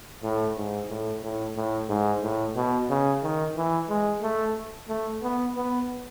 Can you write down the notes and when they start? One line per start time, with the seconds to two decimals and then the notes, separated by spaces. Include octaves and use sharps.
0.23 A2
0.57 G#2
0.89 A2
1.23 A2
1.56 A2
1.89 G#2
2.23 A2
2.56 B2
2.90 C#3
3.23 D#3
3.56 E3
3.89 G#3
4.22 A3
4.89 A3
5.23 B3
5.56 B3